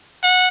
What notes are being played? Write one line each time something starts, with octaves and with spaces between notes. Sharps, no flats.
F#5